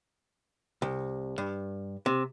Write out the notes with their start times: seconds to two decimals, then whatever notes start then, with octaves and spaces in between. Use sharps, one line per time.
0.82 C2
1.38 G2
2.06 C3